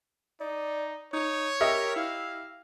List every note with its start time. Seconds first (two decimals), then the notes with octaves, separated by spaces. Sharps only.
0.40 D#4 D5
1.13 D#4 C#5
1.60 G4 A#4 D#5 E5
1.96 E4 F5